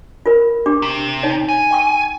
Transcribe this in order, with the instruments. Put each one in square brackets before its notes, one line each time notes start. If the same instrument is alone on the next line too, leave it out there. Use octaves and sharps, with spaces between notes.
[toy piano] F4 A#4 B4
D4 G4 D6
[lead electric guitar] C3
[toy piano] D#4 C#5
[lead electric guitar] G#5
[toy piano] G5 C#6 E6